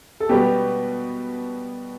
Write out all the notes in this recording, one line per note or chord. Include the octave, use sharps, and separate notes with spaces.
A4
B2 G3 B3 G4